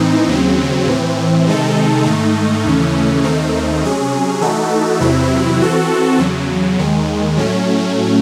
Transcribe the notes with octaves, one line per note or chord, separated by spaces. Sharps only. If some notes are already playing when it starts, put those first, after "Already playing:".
Already playing: A2 E3 C4 D#4
D#2 C#3 F#3 C4
A2 E3 C4
C3 D#3 G#3 D#4 A4
G#2 D#3 A3 D#4
D#2 C#3 E3 A3 C#4
D#2 D#3 A3 C4 D#4
C3 F#3 C#4 G#4
E3 A3 D#4 F#4 A4
E2 C3 F#3 C4 E4
E3 C4 F#4 A4
E2 C#3 F#3
D#2 D#3 G#3
A2 F#3 A3 C#4